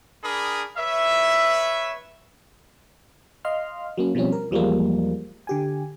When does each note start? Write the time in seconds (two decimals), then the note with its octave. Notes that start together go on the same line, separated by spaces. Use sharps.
0.23 D4 G#4 A#4 B5 D#6
0.78 B4 C#5 E5
3.45 D#5 F5 C6 F6
3.98 F#3 A#3 C#4
4.15 B2 F3 G3 C4 C#4
4.32 A#4
4.51 E2 F3 G3 G#3 A#3
5.47 D3 G4 G#5